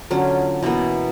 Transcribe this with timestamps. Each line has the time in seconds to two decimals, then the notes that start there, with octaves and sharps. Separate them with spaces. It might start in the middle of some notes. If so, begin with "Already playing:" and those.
0.11 D3 F#3 C#4 F4
0.63 B2 E3 A#3 B3